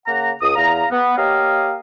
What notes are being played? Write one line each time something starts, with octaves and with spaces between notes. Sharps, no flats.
C#3 A#3 F#5 A#5
C#2 D#6
E2 F5 A#5
B3
A#3 G4 C#5 D#5 F5